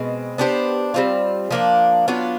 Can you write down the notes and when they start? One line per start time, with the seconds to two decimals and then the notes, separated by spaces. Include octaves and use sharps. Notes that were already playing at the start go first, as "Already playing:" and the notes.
Already playing: B2 G#3 C4
0.38 B3 D4 G4 C5
0.94 G3 C4 F4
1.51 F3 A#3 D4
2.08 F#3 B3 D4 F4